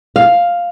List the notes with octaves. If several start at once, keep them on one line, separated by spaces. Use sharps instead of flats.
F5